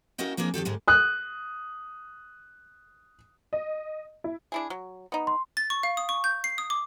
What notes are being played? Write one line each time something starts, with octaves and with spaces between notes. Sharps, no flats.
A#3 C#4 E4 F#4 D#5 G5
F3 A#3 C4 D4 G#4
F2 D#3 G4 A4
D2 G#2 G3 G#3
D#6 F#6
D#5
E4
D4 E4 G#4
F#3
B3 D#4
C6
A6
C#6
F5
D#6
C#6
G6
C7
D#6
D6